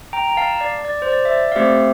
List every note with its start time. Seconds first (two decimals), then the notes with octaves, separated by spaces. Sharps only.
0.13 G5 A#5
0.27 A#5
0.37 F5 A5
0.61 D5
0.85 D5
1.02 C5
1.08 D5
1.25 E5
1.32 D5
1.52 F5
1.56 A3 C4 G4 C5 E5